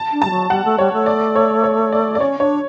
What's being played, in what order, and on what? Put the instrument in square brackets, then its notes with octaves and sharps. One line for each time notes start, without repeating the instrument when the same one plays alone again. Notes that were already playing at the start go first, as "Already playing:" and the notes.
Already playing: [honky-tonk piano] A5
[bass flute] D4
[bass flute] G3 [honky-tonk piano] A5
[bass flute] F#3
[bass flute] G3 [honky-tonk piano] F#5
[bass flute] A3
[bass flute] G3 [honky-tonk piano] C#5
[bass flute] A3
[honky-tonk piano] D5
C#5
C#5
D5
D5
[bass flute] C#4 [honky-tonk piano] C#5
[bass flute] D4 [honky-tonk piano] C#5